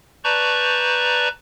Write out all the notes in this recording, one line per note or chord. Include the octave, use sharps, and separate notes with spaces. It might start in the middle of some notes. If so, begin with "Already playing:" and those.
B4 D5 A5 A#5 C#6 G6